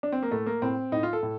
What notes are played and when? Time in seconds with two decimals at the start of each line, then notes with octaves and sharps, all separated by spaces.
0.03 D4
0.12 C4
0.23 A#3
0.31 A2 A3
0.46 A#3
0.62 A2 C4
0.92 A2 D#4
1.03 F4
1.13 A4
1.23 A2